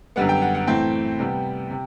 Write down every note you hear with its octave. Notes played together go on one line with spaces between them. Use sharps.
F#2 D3 G3 B3 F#5
G5
F#5
F#5
A2 E3 A3 C4 G5
C3 G3 B3
C3